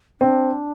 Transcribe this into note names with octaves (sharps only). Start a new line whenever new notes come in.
C4 D4